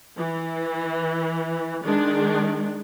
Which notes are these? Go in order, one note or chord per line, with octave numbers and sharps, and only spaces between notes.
E3
D#3 G#3 D4